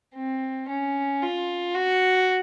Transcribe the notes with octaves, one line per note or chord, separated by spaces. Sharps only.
C4
C#4
F4
F#4